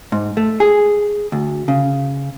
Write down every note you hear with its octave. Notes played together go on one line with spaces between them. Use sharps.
G#2
A3
G#4
D2
C#3